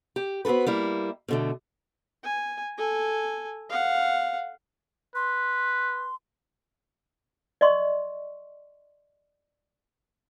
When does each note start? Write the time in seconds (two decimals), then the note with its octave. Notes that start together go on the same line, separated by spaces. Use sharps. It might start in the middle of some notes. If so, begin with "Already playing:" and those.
0.16 G4
0.45 B3 C4 F#4 A4 B4
0.67 G3 A#3 E4
1.28 B2 D3 A3
2.24 G#5
2.78 A4 G#5
3.70 F5 F#5
5.15 B4 C6
7.61 D5 D#5 C6 C#6